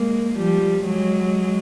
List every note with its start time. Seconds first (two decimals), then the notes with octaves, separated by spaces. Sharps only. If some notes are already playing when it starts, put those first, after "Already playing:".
Already playing: G#3 A#3
0.37 F3 G3
0.85 F#3 G#3